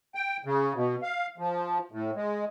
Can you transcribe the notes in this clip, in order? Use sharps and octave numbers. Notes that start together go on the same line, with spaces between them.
G5
C#3
B2
F5
F3
A2
G#3